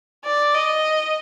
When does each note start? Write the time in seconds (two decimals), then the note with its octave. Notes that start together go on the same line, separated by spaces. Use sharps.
0.25 D5
0.54 D#5